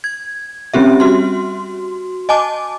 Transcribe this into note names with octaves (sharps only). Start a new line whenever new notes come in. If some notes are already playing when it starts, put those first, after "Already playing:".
G#6
G3 C4 C#4 G4 E5
F#4 C6
D#5 G#5 A5 D6